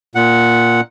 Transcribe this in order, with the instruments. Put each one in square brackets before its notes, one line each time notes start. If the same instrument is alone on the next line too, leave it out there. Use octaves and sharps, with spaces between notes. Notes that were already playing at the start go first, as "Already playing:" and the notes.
[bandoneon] A#2 F#5